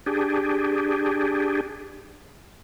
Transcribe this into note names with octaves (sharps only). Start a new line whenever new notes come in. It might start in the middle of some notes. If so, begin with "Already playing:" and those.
D4 G4 G#4